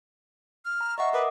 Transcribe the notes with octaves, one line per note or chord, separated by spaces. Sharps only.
F6
A#5
D#5 E5 F#5 C#6
A#4 B4 D6 D#6